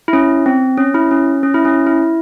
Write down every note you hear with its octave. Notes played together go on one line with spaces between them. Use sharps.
E4
C#4
C4
C#4
E4
C#4
C#4
E4
C#4
E4